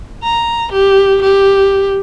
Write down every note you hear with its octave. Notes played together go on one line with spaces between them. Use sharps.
A#5
G4
G4